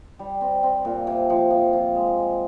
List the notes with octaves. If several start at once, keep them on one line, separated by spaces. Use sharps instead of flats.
G3
C4
C4
A#2
C3
F3
F3
F3
G#3
G#3